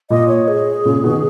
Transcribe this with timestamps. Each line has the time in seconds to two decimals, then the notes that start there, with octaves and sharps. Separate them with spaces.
0.10 A#2 D#5
0.28 C#5
0.48 G#4
0.85 A#2 C#3
1.04 B2 D#3